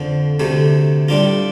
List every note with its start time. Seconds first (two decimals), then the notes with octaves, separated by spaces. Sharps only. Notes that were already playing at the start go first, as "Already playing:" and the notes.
Already playing: F2 D3 F3
0.40 D2 C3 A3
1.08 A2 G3 D4 F4